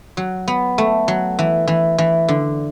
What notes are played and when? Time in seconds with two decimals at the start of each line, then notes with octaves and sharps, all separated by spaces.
0.17 F#3
0.48 B3
0.78 A3
1.08 F#3
1.39 E3
1.67 E3
1.98 E3
2.28 D3